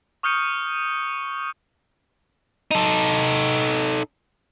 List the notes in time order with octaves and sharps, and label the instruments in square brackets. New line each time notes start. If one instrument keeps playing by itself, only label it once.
[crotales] C#6 D#6 F6 G6 C#7 D#7
[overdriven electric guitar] D#4 A4